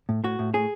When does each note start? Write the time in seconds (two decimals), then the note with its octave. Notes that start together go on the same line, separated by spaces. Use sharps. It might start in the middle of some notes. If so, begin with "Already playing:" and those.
0.09 A2
0.24 A2 F#4
0.39 A2
0.54 A2 G#4